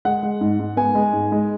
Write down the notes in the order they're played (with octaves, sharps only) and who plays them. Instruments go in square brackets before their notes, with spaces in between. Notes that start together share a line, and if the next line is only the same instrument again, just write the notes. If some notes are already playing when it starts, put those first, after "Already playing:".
[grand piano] G#3 F#5
G#3
G#2
G#2
B3 G#5
G#3
G#2
G#3